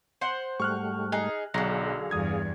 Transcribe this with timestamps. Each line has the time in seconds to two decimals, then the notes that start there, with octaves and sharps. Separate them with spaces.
0.21 C5 F#5
0.60 G#2 G3 A3 C#6 F6 F#6
1.12 D#4 G#4 F#6
1.54 B1 D3 F#3 G#4 F5 A#6
2.11 E2 G2 D#6 G#6